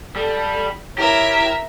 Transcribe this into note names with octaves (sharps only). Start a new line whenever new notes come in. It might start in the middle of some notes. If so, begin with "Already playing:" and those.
G3 A4
E4 G4 A#4 C#5 E5